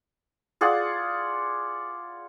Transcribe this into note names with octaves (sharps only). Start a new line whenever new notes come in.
F4 G#4 D5 F#5